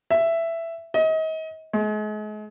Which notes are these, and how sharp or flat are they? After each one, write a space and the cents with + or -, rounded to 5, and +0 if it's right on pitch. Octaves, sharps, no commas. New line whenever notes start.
E5 +10
D#5 +35
G#3 +40